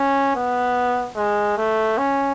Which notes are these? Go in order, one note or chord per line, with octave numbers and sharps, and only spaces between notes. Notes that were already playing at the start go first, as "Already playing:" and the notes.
Already playing: C#4
B3
G#3
A3
C#4